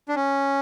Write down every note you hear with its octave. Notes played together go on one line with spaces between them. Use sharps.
D4
C#4